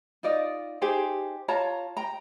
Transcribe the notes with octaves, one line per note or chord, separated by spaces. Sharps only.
D#4 F4 D5 D#5
D#4 G4 G#4 C5
F4 C#5 A5 A#5
G5 A#5